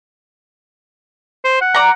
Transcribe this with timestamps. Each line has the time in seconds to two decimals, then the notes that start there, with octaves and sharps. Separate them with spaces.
1.45 C5
1.61 F#5
1.74 D5 A#5